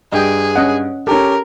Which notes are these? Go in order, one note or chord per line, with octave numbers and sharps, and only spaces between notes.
G2 G#4 D#5 G5
C#4 D#5 F#5
C#4 G4 A4 A#4